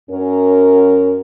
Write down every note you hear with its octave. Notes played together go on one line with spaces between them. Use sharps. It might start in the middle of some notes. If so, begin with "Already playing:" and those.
F#2 C#4 A#4